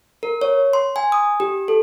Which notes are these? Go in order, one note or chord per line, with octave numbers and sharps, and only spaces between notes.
A#4
C#5
C6
G#5
D#6
G4
A4